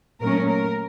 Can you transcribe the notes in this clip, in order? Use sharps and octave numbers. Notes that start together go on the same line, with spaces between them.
A#2 F#3 A3 C#4 A#4
A#4